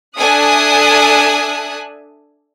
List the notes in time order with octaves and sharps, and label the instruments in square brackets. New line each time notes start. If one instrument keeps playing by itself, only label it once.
[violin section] D4 A4 E5 G#5 D#6 F#6